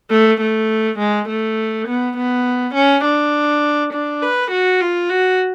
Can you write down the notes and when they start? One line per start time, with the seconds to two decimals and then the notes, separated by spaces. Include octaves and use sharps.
0.11 A3
0.41 A3
0.99 G#3
1.29 A3
1.88 B3
2.17 B3
2.74 C#4
3.04 D4
3.93 D4
4.22 B4
4.51 F#4
4.80 F4
5.09 F#4